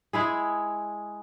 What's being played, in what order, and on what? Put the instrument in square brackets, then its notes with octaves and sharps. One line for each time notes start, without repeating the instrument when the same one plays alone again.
[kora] G#3 E4 G#4